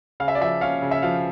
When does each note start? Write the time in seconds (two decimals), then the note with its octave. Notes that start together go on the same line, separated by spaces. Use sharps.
0.20 C#3 F5
0.28 E5
0.35 D5
0.41 F3 E5
0.61 C#4 F5
0.82 C#3
0.91 E5
1.02 F3 F5